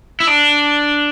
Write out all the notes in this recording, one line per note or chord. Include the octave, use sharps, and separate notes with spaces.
E4
D4